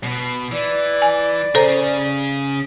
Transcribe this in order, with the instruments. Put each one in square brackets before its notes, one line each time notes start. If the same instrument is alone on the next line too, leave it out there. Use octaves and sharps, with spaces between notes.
[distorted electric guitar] B2
[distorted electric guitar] E3 [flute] D5
[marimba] G#5
[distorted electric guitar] C#3 G#4 [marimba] A4 C5 A#5